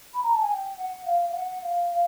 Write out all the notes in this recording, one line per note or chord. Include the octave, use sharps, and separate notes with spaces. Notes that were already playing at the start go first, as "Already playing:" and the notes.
B5
A#5
A5
G#5
G5
F#5
F5
F5
F#5
F5
F5